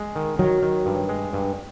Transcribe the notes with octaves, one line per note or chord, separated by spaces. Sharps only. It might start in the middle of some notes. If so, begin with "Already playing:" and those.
Already playing: G#3
D#3
D#3 F#3
D#3
G2
G#3
G2